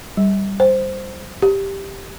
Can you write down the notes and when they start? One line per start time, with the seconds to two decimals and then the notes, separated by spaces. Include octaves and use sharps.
0.17 G3
0.60 C5
1.42 G4